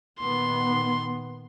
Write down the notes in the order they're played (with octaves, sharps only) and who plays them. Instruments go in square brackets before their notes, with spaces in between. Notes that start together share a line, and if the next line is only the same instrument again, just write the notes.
[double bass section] A#2 D#3 B3 [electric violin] C6